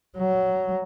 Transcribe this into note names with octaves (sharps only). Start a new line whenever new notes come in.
F#3